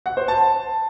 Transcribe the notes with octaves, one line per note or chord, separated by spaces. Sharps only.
F#5
C5
A5